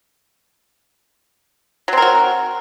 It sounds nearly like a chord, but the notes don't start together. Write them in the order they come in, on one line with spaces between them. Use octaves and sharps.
F#3 C4 A#4 F#4